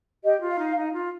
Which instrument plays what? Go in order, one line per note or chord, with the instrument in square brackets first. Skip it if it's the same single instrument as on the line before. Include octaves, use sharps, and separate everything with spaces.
[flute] G4 [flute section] D#5
[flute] F4
[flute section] F5
[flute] D#4
D#4
F4